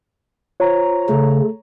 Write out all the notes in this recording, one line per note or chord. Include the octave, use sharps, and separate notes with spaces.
F4 C5 C#5 A#5
C#3 A3 A4